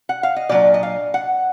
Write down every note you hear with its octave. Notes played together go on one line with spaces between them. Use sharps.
F#5
F5
D#5
A#2 F#3 D4 D5
D#5
F5
F#5